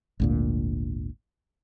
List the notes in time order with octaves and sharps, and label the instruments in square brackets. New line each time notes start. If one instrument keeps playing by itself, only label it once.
[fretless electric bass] G#1 D2 A#2